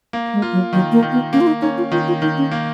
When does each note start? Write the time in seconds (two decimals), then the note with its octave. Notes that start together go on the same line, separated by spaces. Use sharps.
0.13 A#3
0.33 G#3
0.42 F4
0.53 F#3
0.73 D#3 F#3
0.92 A#3
1.02 D#3
1.12 B3
1.33 A#3 C#4
1.41 F4
1.47 D#4
1.62 C#4 D#4
1.78 F4
1.92 D#3 F4
2.08 F4
2.22 D#3 D#4
2.37 C#4
2.52 A#3